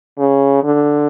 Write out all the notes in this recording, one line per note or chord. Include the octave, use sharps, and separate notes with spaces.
C#3
D3